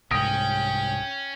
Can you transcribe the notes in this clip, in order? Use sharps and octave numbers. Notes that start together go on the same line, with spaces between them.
C2 G#2 C#4 G5 D#6 A#6 D7